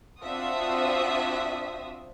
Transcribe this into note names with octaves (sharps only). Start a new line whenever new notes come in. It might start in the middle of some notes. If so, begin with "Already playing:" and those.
C4 D4 F4 F#4 E5 D#6